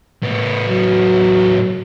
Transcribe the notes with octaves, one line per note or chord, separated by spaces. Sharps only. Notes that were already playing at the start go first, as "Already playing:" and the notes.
A2 B3
F#3